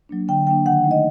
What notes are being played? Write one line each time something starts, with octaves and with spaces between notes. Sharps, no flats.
F#3 A#3 D4
D3 G5
F#3 A#3 D4 G5
D#3 F#5
A3 D#4
D#5